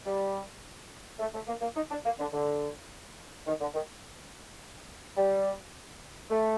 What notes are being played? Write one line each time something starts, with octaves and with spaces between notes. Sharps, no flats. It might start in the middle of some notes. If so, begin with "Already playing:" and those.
G3
A3
A3
A#3
A#3
D#4
D4
A#3
D3
D3
D#3
D3
D#3
G3
A3